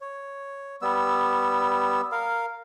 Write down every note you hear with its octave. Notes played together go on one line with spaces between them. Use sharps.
C#5
G3 B3 E6
A#4 F5